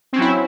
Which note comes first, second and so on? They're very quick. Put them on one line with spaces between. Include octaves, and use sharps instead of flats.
C4 C#4 F#3 E4